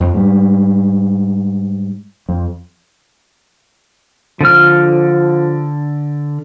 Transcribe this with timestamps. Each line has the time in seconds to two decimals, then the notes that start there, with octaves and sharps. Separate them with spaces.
0.01 F2
0.14 G#2 G3
2.29 F2
4.41 D3 F3 F6